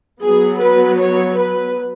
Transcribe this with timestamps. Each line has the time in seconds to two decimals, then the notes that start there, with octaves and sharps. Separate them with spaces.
0.22 F#3 B3 G#4
0.61 B4
1.00 C#5
1.38 B4